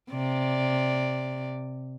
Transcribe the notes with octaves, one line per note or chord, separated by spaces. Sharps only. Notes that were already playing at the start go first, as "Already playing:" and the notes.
C3 D5